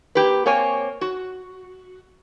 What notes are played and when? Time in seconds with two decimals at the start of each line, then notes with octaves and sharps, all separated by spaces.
0.15 A#3 G4 B4
0.46 A#3 C4 C#5 G#5
1.01 F#4